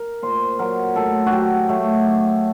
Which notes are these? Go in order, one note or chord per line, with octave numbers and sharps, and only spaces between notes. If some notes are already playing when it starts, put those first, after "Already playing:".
Already playing: A#4
A#2 C5
F#3 A#4
A2 A4
F#4
F#3 G4
F#3 A3
F#3